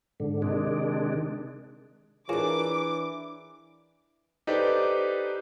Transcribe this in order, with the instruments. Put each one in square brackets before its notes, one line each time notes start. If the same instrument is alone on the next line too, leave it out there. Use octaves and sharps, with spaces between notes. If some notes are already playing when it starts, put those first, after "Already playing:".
[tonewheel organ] G#2 D3
C3 D#3 G#3 D4
[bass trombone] E3 [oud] D4 A#4 [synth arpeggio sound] F4 G#4 C#5 [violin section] D6
[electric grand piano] D#4 G4 A4 B4 C5 D5